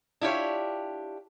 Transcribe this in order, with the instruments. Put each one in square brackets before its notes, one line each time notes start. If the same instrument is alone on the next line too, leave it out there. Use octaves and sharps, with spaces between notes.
[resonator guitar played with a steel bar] D4 E4 F4 G4 C#5